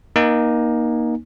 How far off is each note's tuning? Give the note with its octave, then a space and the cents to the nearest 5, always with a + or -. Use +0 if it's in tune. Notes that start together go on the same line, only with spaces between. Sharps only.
A#3 +25 D#4 +0 G#5 -5